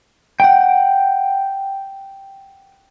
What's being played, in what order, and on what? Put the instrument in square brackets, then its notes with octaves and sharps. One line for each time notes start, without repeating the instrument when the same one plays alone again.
[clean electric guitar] F#5 G5